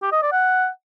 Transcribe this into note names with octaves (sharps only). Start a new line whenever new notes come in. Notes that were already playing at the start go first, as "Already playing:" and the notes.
G4
D#5
D5
F#5